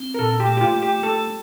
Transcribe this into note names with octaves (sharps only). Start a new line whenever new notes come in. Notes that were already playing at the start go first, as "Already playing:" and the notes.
Already playing: C4
A#4
A#2 A4
G4
A3
G4
F4
A3
G4
A3 A4